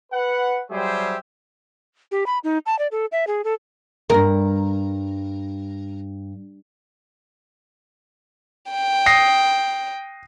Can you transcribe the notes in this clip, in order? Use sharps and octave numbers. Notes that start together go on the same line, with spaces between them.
B4 F#5
F#3 G3 G4 G#4 C5 E5
G4
B5
D#4
A5
D5
A4
E5
G#4
A4
E2 G2 A#4
G5
D#6 A#6 C7